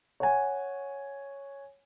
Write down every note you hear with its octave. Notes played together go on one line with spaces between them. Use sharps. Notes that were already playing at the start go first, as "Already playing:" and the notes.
C#5 F#5 G#5